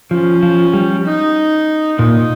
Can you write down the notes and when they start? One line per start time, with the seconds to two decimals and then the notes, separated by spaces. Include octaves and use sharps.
0.11 F3 C#4
0.43 F3
0.73 G3
1.05 D#4
1.99 A#2 D#4